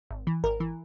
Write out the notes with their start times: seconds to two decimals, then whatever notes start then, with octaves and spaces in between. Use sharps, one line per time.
0.11 G#1
0.27 E3
0.44 G#1 A#4
0.60 E3